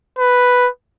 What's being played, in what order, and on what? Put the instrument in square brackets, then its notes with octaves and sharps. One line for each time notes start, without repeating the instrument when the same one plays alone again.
[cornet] B4